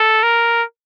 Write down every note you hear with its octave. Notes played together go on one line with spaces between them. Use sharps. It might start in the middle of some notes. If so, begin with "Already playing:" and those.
Already playing: A4
A#4